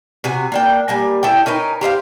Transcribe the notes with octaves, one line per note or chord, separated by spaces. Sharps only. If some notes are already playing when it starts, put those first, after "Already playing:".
C3 F#4 G#5
A#3 D4 G5
G3 A#3 G#5
E4 A4 G5
C#4 D#4 A#4 B4
G4 C5 E5 F5